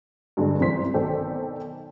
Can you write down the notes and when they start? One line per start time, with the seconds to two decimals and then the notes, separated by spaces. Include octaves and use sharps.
0.37 G2 D3 G#3
0.60 C2 C3 E3 C5 C6 B6
0.94 B1 D#3 A4 C5 D5 G5